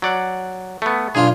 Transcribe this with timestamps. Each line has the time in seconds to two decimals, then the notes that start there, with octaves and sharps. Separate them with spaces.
0.02 F#3 D5 F#5
0.82 A3 B3
1.15 B1 D4 F4 G#4